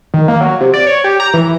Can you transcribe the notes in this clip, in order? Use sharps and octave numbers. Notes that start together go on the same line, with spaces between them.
D#3
A#3
F#3
C3
D5
C#5
G4
A#5
E3